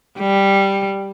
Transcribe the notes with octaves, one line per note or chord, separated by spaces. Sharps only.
G3